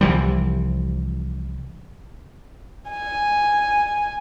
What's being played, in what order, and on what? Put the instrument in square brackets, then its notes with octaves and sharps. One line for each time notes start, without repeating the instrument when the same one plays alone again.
[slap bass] C2 E3 F3 G3
[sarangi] G#5